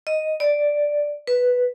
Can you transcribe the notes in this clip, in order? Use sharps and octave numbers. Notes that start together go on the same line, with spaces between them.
D#5
D5
B4